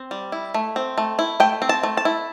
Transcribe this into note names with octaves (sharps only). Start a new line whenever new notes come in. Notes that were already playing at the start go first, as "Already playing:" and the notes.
Already playing: C4
G3
E4
A3
C4
A3
E4
A3 G5
C4
A5
A3
A5
E4